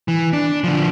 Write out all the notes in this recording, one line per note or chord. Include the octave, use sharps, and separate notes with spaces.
E3
D4
D3 F3